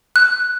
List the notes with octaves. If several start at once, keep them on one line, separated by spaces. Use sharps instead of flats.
F#6